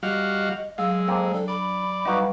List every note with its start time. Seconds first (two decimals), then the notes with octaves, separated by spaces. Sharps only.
0.03 G3 F#4 D#5 F5
0.78 F#3 G#3 F5 E6
1.08 F2 A#3 C4
1.33 D4 A4
1.48 D5 B5
2.05 G3 D#4 F#4 B4 F5